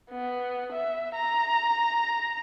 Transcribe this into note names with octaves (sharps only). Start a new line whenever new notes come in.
B3
E5
A#5